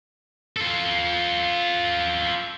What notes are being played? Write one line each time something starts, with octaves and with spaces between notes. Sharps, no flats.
F4 A4